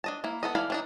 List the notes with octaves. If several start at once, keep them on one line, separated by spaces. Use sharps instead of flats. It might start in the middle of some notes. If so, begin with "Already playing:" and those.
D4 D#5 A5
A#3 E4
B3 A4 D#5
E3 A4 D5 F5 B5
E3 D4 D#4